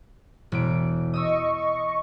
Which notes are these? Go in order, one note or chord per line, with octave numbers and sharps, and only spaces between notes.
E1 D7
D#5 C#6 D#6 E6